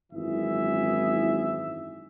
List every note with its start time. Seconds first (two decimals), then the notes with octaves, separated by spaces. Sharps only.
0.13 G#1 F#2 E3 E4 G#4 E5